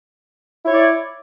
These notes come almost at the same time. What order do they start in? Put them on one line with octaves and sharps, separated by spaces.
E4 C#5 D5